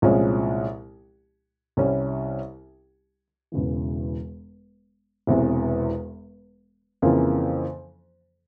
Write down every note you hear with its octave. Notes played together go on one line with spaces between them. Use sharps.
C2 A#2 F3 G#3 C#4
C2 C3 G3 C#4
E1 E2 C#3 E3
E1 E2 C3 E3
F2 C#3 E3 A#3 F4